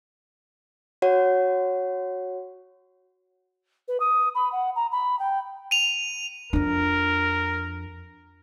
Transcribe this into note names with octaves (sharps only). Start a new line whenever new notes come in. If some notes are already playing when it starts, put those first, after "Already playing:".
F#4 C#5 F#5
B4
D#6
B5
F#5
A#5
B5
G5
D#7 F7
F2 D4 A#4